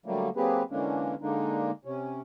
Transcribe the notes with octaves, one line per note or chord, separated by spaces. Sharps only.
D3 F#3 G3 A3 A#3
F#3 A#3 C4 G4 G#4 B4
D3 E3 G#3 A#3 C#4 D4
D3 G#3 A#3 D4 D#4
C3 C#4